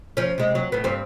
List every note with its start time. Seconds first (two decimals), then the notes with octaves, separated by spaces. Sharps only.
0.17 F3 C#4
0.38 C3 G#3
0.55 F#3
0.72 A2 B3
0.84 G2 C4